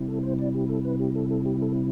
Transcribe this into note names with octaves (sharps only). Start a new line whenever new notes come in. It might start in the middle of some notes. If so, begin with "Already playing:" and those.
Already playing: C3 G3 C4 E4
A4
C5
D5
G4
A4
B4
G4
A4
A4
G4
A4